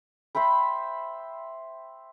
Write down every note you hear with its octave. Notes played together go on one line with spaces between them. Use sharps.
C5 E5 G5 B5